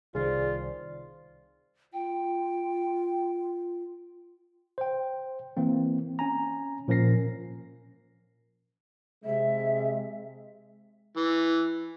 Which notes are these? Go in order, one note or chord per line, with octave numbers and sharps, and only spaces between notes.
C2 D#3 F4 G#4 C5 D5
F4 G5
C5 G5
E3 A#3 C4
C#4 G#5 A#5
A#2 F3 C#4 A#4 A#6 C7
C3 G#3 E5
E3